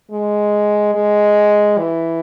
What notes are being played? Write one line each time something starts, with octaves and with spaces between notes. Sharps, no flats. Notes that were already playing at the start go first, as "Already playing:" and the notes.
G#3
G#3
E3